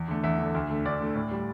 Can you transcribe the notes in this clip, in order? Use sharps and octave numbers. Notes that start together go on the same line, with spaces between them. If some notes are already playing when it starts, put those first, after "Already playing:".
Already playing: E2
D3 A3
E2 E5
D3 A3
D2
D3 A3
D2 D5
D3 A3
A2
G3